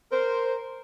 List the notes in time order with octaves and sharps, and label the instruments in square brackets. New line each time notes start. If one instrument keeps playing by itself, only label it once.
[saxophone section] A#4 C5